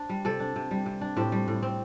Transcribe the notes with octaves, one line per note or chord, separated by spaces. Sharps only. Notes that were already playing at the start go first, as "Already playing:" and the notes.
Already playing: D4 C5
G3
C3 A4 D5
D4
C3
G3
C3
D4
A2 G4 C5
G3
A2
C4